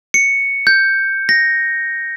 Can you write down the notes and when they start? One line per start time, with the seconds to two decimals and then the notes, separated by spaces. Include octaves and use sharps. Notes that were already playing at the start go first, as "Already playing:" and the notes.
0.14 C#7
0.67 G6
1.29 A#6